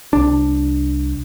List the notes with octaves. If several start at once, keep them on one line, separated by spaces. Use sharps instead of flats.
C2 D4